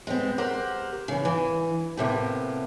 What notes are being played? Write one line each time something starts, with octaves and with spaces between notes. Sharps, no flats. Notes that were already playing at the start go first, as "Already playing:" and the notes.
G#3 B3 C4
G4 A#4 C5 F#5
C#3 E3
E3
A2 C3 A#3 B3